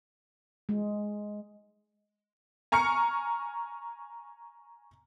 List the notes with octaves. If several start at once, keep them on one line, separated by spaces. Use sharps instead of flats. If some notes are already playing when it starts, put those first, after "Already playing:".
G#3
G#5 A#5 C#6 F6 C#7